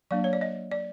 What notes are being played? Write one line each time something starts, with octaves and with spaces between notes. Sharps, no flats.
F#3 A#3 D4 D5
C#5
D5
D#5
D5